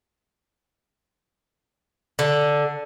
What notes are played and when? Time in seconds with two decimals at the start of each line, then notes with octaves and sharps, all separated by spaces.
2.19 D3